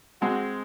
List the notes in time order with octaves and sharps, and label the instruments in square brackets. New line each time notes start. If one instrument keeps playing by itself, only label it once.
[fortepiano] G#3 C4 [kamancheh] F#4